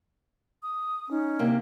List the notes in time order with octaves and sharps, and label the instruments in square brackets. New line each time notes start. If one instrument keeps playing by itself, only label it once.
[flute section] D#6
C#4 D#4
[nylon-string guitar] C3 A#3 D4